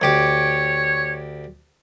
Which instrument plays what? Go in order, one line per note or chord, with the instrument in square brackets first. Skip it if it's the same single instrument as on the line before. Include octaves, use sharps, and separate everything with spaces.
[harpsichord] D2 G4 D6 [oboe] C#5